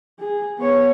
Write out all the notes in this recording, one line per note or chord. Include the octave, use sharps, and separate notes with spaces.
G#4
B3 C#5